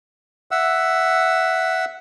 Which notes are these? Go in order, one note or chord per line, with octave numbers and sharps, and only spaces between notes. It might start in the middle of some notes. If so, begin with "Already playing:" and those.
E5 F#5 E6